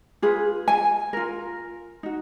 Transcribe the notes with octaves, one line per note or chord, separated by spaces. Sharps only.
F4 G#4 B4
G#5
F4 A#4
D#4 F#4